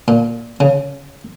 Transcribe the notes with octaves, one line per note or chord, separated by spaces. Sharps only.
A#2
C#3